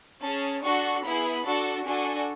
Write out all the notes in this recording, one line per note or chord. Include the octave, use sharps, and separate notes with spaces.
C#4 G#4 A5
D4 F#4 A4 C#6
B3 E4 G#4 B5
D4 F#4 A4 A5
D4 F#4 A4 G#5